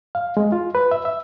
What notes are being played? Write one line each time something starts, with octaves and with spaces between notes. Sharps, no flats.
F5
G#3
F4
B4
E5
E5